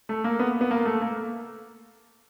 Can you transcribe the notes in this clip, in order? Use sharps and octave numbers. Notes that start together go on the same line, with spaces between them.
A3
A#3
B3
B3
A#3
A3
A#3